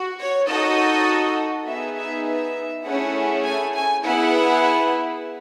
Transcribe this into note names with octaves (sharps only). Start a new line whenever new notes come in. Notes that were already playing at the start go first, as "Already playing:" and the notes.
Already playing: F#4
C#5
D#4 F#4 A4 D#5
B3 D#4 G#4 E5
E5
E5
A3 C#4 E4 G#4 F#5
G#5
G#5
B3 E4 G#4 F#5